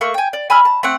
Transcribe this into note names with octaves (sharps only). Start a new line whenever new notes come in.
A3 A#3 C#6
G5 G#5
D5
G#5 B5 E6 F6
A5
A3 C4 F#5